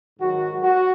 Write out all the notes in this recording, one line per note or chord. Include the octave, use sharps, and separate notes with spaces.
G#2 D#3 F#3 F#4
F#4